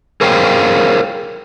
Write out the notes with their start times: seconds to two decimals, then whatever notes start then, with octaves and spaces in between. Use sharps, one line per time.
0.21 G#4 A#4 C5 C#5 F5 G5